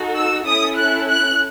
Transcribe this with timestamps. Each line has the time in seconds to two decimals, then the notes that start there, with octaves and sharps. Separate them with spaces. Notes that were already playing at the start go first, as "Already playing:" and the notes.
Already playing: D#4 F#4 A4
0.15 E6
0.46 C#4 E4 A4 D#6
0.77 F#6
1.08 F#6